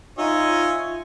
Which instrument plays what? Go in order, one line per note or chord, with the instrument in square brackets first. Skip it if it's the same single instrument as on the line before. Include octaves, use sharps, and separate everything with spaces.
[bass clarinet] D#4 [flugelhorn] F4 [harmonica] C#5 D#5 G#5 [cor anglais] E5